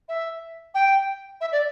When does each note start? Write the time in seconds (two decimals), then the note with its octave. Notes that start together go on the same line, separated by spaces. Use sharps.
0.08 E5
0.74 G5
1.41 E5
1.52 D5